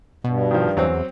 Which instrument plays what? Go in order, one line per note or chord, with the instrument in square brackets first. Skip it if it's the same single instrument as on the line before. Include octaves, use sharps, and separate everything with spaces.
[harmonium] G2 [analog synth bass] B2
[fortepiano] D#3 F3
[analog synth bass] E2 [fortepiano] F#3 C4